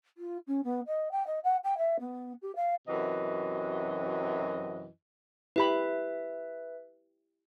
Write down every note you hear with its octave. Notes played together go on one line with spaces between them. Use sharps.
F4
C#4
B3
D#5
G5
D#5
F#5
G5
E5
B3
G4
F5
F#2 C3 E3 F#4 D#5
E4 G4 B4 E5 B5